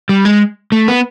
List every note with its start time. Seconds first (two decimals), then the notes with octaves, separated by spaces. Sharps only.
0.09 G3
0.25 G#3
0.72 A3
0.88 B3